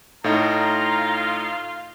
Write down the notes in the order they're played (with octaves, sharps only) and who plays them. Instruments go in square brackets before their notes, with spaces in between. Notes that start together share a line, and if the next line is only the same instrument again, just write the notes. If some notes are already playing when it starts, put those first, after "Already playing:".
[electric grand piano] A2 D#4 [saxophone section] F4 F5 [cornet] A#5